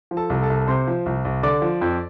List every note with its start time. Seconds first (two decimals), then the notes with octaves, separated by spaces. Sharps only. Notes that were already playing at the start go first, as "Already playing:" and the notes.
0.11 F3
0.17 A4 A5
0.30 C2
0.43 A4 A5
0.50 C2
0.67 C3 C5 C6
0.87 F3
1.06 C2
1.25 C2
1.43 D3 D5 D6
1.62 F3
1.81 F2